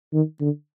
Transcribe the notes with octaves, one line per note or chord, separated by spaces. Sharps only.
D#3
D3